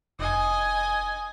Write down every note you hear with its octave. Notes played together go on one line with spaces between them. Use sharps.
F1 D#5 G#5